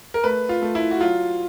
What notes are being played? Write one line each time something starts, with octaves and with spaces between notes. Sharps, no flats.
A#4
A3 B4
F4
A3
E4
F#4
F#3 F4